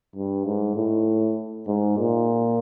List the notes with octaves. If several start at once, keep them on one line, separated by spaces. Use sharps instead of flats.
G2
G#2
A2
G#2
A#2